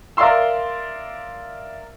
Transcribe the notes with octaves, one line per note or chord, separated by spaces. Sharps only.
A#4 D5 E5 F5 C6 E6